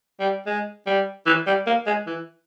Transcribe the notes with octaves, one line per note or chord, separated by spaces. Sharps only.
G3
G#3
G3
E3
G3
A#3
G#3
E3